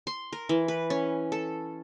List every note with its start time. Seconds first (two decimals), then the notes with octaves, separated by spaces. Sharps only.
0.07 C6
0.32 A#4
0.49 E3
0.68 B4
0.90 C#4
1.32 A4